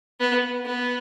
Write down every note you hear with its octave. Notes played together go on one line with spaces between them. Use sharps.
B3
B3